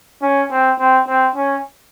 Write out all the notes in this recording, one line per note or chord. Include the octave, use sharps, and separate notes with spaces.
C#4
C4
C4
C4
C#4